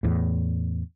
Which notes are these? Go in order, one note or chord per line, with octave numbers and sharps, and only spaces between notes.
E2 A2